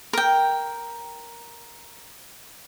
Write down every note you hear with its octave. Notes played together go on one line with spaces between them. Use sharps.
A#4 G5